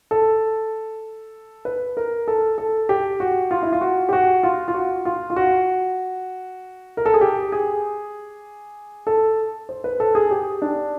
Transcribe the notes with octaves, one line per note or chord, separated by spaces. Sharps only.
A4
B4
A#4
A4
A4
G4
F#4
F4
E4
F4
F#4
G4
F#4
F4
F4
F#4
F4
F4
F#4
A#4
A4
G#4
G4
G#4
A4
C5
B4
A4
G#4
G4
D4